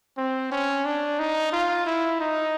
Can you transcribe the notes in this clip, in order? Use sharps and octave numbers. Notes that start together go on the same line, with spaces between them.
C4
C#4
D4
D#4
F4
E4
D#4